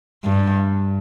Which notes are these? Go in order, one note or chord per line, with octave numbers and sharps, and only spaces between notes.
G2